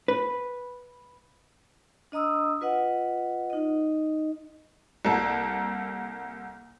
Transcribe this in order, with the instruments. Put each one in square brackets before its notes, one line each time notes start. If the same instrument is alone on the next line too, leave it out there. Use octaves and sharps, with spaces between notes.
[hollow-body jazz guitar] B4
[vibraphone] D4 D#5 A#5 D#6 E6
F4 B4 D#5 F#5
D#4 D#5
[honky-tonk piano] C2 A#3 A4